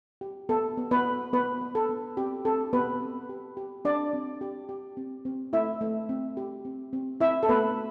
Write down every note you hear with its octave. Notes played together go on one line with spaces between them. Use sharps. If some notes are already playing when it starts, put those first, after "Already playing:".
G4
B3 A4
B3
B3 B4
B3
B3 B4
B3
A4
B3
C4 G4
C4 A4
B3 G4 B4
C4
G4
G4
C4 D4 D5
C4
G4
G4
C4
C4
A3 E4 E5
A3
C4
G4
C4
C4
C4 E4 E5
A4
A3 B3 B4